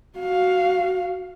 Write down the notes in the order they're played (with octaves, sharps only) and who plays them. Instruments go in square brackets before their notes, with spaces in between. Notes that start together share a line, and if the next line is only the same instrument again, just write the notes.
[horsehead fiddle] F#4 F5